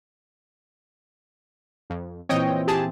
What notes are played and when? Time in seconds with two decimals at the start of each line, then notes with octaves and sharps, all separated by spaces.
1.90 F2
2.29 A#2 E3 C4 C#5 D#5 G5
2.67 G4 G#4 A5